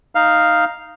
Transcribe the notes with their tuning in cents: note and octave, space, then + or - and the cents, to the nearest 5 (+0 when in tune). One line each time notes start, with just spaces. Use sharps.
D#4 +0 F5 +0